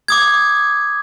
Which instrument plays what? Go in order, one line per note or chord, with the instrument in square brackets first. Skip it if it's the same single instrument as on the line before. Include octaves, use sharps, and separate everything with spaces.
[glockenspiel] D6 D#6 G#6